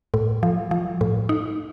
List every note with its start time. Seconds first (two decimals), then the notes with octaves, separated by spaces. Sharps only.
0.14 A2
0.43 F3
0.71 F3
1.01 A2
1.29 D#4